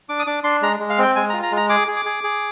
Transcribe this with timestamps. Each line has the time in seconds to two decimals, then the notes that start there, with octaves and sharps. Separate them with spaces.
0.09 D4 D6
0.19 D#6
0.27 D4 D6
0.44 D4 C6
0.62 G#3 A#5
0.80 G#3
0.90 F5
0.98 C4 G5
1.16 G#3 G#5
1.29 F4 A#5
1.43 A#5
1.52 G#3
1.57 A#5
1.69 G#4 D6
1.88 G#4
1.96 D6
2.05 G#4
2.24 G#4